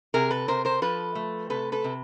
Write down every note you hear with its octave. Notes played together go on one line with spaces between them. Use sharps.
C3 G#4 A#4
A4 B4
C3 A#4 C5
A#4 C5
F3 A4 B4
A3
C3 A4 B4
A4 B4
C3